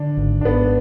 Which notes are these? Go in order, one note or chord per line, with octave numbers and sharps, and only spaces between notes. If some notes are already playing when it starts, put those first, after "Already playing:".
Already playing: D3 D4
G#1
D4
G#1 B3